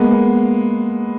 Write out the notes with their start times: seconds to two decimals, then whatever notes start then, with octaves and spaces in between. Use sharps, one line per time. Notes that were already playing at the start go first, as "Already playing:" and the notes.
Already playing: G#3 A#3 B3
0.11 B3